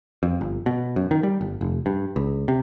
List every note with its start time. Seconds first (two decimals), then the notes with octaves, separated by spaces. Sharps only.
0.23 F2
0.41 G1
0.66 B2
0.96 F#2
1.11 D#3
1.23 G3
1.41 G1
1.61 F1
1.86 G2
2.16 C#2
2.48 C3